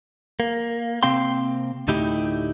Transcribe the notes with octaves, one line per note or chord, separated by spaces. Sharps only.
A#3
C3 A#3 C4 F5 G5 C6
D2 A2 D#4 E4 G4